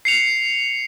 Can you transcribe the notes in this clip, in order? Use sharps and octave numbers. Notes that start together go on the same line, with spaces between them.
C7 C#7 F7